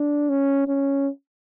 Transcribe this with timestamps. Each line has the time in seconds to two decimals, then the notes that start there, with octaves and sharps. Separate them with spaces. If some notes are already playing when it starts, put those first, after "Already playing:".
Already playing: D4
0.29 C#4
0.68 C#4